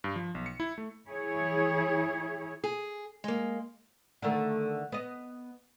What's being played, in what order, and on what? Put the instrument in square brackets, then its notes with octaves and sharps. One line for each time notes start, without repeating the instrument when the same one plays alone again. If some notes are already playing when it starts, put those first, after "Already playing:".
[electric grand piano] G2
F3
B1
C#7
E4
A3
[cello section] E3 E4 G#4 C#5
[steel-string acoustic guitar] G#4
G#3 A#3
[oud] D3 D#3 A3
B3 D#5